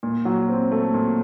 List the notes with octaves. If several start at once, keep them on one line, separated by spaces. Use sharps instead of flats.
A#2
F#3
C4
A3
A#2